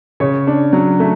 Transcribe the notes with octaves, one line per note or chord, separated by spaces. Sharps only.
C#3 C#5
D4
F#3
A3